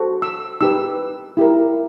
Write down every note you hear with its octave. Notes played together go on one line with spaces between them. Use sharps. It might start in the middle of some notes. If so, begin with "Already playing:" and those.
Already playing: F#4 A4 C5
E6
D#4 G4 B4 E6
E4 G4 A#4